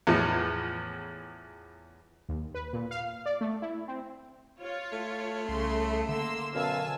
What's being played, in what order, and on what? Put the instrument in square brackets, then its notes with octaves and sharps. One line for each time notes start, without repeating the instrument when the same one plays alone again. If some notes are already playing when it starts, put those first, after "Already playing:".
[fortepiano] E2 A2 F3
[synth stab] D#2
B4
A#2
F5
D5
A3
E4
C4
[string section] F4 C#5
[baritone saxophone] A3
[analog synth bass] C2 [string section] C#3 C6
[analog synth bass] D3 [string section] A#3 C6 E6
[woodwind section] F#2 B2 F5 [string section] G#5 A5 E6